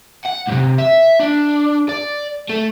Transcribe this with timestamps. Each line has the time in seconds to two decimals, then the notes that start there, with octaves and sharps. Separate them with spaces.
0.25 F#5
0.47 C#2 C3
0.78 E5
1.20 D4
1.89 D5
2.50 A3